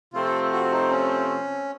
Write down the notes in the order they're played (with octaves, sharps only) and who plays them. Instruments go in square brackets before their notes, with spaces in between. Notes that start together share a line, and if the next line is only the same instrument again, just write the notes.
[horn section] C3 F3 A3 C4 [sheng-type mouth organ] F4
[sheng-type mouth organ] A4
F#4
D#4
C#4